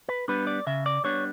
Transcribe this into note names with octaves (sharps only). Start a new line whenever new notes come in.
B4
G3 B3 D4 B4
D5
C#3 E5
D5
G3 B3 D4 C#5